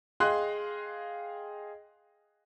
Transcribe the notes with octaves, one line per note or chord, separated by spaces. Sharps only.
G#4 D#5 F5 G5 C6 F#6